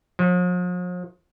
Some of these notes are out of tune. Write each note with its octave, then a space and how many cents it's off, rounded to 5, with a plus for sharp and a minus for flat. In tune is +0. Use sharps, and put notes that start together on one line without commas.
F3 +45